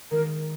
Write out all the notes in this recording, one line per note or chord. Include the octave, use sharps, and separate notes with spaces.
D#3 G#3 D#4 A#4